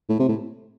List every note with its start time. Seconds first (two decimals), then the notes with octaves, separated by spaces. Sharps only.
0.10 A2
0.20 C3
0.29 A2